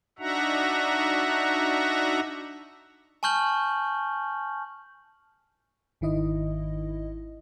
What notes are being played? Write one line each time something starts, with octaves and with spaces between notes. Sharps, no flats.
D4 D#4 F#4 E5 F#5 A#5
G#5 A5 C#6 F6 G6 F#7
G#1 D#3 E4 D#5